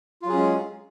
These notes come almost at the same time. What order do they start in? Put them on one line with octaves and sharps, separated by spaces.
F4 F#3 G#4 C#4 G#3